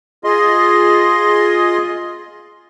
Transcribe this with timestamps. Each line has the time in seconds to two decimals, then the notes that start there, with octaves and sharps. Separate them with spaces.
0.24 F4 G#4 D#5 C6